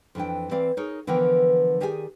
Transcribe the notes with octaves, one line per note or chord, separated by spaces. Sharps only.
F2 E3 D4 G5
E3 C4 D5 F5
D#4 G#4 A#4 C#5
D3 E3 F3 B3 A#4 G5
D#3 G4 G#4 D5 D#5 G#5